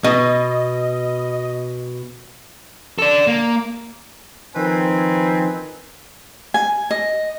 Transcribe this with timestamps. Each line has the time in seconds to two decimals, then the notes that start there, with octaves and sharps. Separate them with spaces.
0.04 B2 D#5
2.99 A4 D5
3.27 A#3
4.56 D#3 F3 C4 D#4 A#4 B4 G#5
6.54 G#5
6.91 D#5